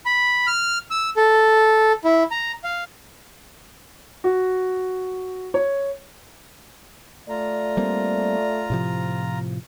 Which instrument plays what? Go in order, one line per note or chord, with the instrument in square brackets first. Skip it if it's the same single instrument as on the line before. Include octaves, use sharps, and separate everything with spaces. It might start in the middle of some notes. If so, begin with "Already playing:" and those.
[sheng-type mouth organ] B5
F6
E6
A4
E4
A#5
F5
[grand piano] F#4
C#5
[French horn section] A3 D5 [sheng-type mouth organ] F4 A#5
[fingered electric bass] G3 A#3 C4
A2 C3 F3